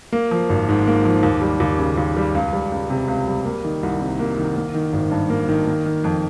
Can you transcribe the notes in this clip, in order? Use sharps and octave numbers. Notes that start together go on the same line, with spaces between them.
A#3
F3
G#1
G#2
A#3
F3
D#2
G3
D#2
C#3
D#2
G3
C#2
G3
C#2
C3
C#2
G3
A#3
D#3
C2
C3
A#3
D#3
A#3
D#3
G#1
G2
A#3
D#3
A#3
D#3
F2